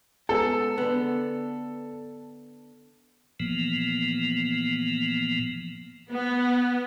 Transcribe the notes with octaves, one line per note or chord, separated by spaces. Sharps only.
G#3 B3 A4
D3 B3
A#2 E3 F3 A#3 B3
B3